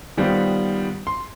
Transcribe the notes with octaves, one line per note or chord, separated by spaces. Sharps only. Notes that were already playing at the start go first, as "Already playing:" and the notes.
D#3 G3 B3 F4 C5 D5
C6